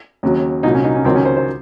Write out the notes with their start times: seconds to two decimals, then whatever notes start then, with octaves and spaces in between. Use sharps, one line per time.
0.23 D#2 C#3 F#3
0.63 C2 A#2 F#3 D#4
0.74 C#4
0.84 D#4
0.95 C#4
1.05 C#2 C3 D#3 F#3 C4
1.15 C#4
1.25 C5
1.37 C5